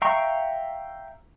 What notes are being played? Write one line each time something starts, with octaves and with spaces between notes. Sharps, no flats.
E5 F5 G5 A#5 C#6